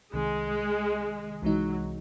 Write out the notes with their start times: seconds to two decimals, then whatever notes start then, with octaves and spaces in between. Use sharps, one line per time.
0.13 C2 C3 D#3 G#3
1.42 C2 C3 E3 F#3 G#3 D#4